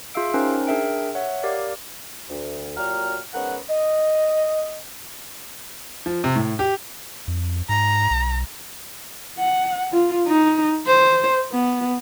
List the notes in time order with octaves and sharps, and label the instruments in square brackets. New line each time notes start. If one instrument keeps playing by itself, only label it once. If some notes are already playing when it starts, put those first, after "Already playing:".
[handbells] F4 G#4 E5 F5 E6 D7
C#4 D#4 A#4 C5 G5
D4 G#4 A#4 E5 G5 D7
C#5 E5 F#5
G4 A#4 D5 F5
[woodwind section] D2
A#2 F#3 G4 F#5 A#5 F6
G#2 B3 C#4 A#4 F#5
D#5
[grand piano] F3
C3
A2
G4
[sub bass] F2
[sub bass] G#2 [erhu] A#5
[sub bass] B1
[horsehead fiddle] F#5
F4
D#4
C5
B3